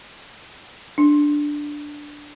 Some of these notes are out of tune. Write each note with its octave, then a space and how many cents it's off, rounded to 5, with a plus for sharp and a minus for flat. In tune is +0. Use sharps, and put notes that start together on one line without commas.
D4 +0